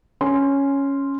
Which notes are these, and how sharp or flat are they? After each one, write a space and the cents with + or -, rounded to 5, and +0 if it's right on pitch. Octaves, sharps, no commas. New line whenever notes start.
C#4 +0 C6 +0